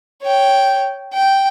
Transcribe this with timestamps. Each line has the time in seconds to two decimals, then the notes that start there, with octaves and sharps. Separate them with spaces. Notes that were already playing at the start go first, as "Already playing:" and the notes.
0.22 C#5 G5
1.13 G5